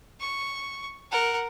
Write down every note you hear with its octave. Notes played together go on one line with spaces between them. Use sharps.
C#6
A#4 F#5